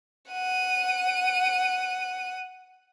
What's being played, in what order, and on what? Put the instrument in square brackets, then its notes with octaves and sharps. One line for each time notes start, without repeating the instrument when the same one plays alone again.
[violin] F#5 D#7